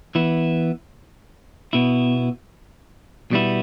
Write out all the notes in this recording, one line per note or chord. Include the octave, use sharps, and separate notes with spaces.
E3 B3 E4
B2 B3 E4
B2 G3 B3 E4